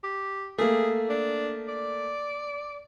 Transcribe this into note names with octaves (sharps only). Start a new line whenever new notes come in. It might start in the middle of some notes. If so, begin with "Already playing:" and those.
G4
A3 A#3 G#4
D4
D5